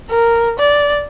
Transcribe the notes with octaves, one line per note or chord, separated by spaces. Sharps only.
A#4
D5